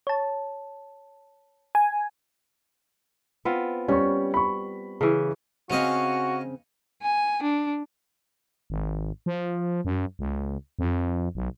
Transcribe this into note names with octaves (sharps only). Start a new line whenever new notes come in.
C#5 A5
G#5
B3 C4 F4
G3 C#4 C#6
B5 C#6
C#3 E3
C#3 C4 C#4 F#4 D#5 F5
G#5
D4
G#1
F3
F#2
C#2
F2
B1